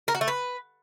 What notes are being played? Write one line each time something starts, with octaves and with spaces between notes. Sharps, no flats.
A#4
F#4
A3
B4